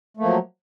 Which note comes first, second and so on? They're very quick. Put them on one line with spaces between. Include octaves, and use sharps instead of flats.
A3 A#3 F3 F#3